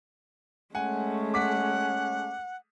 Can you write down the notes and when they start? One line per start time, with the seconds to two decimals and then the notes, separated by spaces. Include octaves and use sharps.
0.75 G#3 A3 C#4 F#5 G#5
1.34 F#5 D6 B6